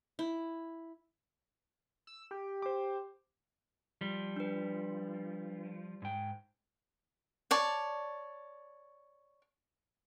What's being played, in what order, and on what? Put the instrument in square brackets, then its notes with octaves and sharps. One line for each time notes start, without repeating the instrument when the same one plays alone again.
[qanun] E4
[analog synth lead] E6
G4
[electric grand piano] C5 D6
[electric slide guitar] F3 [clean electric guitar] G3
[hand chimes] D4 B4
[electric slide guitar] G#2 G5
[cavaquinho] C#5 D5 A5